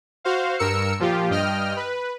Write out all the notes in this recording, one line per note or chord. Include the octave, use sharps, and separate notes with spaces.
F#4 C5 F5
G2 A#4 E6 C#7
A#2 F3 F4 G4
G2 D#5 G5 F6
B4